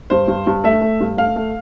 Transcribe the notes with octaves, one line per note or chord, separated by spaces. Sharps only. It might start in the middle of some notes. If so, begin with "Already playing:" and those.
G2 C5
G2
G2
A3 E5
A3
G2
A3 F5
A3